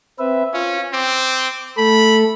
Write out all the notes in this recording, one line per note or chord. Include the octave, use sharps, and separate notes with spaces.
C4 B4 E5
C#4 F4
C4 D6
A3 A4 B5